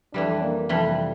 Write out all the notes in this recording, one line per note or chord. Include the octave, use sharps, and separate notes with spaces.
F2 E3 G3 D4
A#3
F2 C3 E3 G3